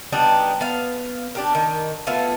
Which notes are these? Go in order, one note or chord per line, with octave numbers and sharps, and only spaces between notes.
G3 B3 D4 D#4
B3 F5
D4 G4 A#4
D#3
A3 B3 E4 F4